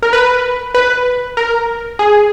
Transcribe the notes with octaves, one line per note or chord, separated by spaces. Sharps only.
A#4
B4
B4
A#4
G#4